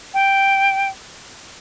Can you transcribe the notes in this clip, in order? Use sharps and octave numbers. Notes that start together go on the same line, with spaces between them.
G5